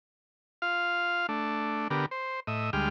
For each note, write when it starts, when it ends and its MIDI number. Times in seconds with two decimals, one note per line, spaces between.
0.62 1.27 65
0.62 1.27 77
1.29 1.88 57
1.29 1.88 62
1.90 2.06 50
1.90 2.06 59
1.90 2.06 67
1.90 2.06 70
2.11 2.40 72
2.47 2.70 45
2.47 2.70 75
2.47 2.70 76
2.73 2.89 38
2.73 2.89 55
2.73 2.89 56
2.73 2.89 79
2.73 2.89 89